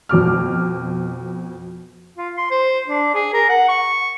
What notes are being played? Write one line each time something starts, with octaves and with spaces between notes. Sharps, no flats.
F2 B2 D6 F6
F4
C6
C5
D4
G#4
A#4
F#5
C#6